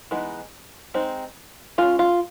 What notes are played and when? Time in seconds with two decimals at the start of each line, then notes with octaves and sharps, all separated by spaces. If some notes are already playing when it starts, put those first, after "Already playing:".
0.11 E3 G#3 B3 D#4
0.94 G#3 C4 D#4
1.78 G#3 C#4 F4
1.99 F4